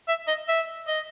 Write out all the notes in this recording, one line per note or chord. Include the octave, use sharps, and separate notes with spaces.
E5
D#5
E5
D#5